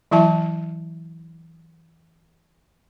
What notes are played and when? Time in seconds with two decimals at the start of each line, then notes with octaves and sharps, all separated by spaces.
0.11 E3 F#3 E4 E5 A5